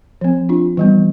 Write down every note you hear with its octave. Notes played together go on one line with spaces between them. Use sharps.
F3 C4
D4 F4
E3 G3 B3